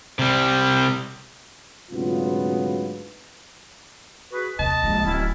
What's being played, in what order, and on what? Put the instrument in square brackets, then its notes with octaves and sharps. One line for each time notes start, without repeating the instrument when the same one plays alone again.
[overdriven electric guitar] C3 G3
[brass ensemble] D2 G#2 C3 F#3 B3 F4
[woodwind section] F#4 G#4 B4
[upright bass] D#2 C3 [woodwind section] D#5 [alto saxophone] A5
[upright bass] A#1 G#3
[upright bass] D1 [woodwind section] C4 C#4 E4